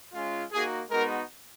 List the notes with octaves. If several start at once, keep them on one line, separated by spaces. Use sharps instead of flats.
G#3 C#4 F4
A#3 D#4 F#4 G#4
G#3 B3 D#4 F#4 A#4